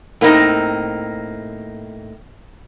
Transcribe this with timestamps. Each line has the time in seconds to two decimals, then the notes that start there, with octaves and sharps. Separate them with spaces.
0.21 A2 A#3 C4 D#4